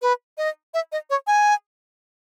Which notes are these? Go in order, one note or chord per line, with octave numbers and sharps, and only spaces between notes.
B4
D#5
E5
D#5
C#5
G#5